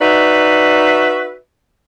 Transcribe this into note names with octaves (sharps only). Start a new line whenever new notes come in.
D#4 F#4 B4 D5 E5